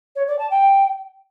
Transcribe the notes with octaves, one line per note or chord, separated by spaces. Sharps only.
C#5
D5
A5
G5